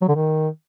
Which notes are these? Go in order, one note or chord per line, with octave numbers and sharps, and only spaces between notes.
F#3
D3
D#3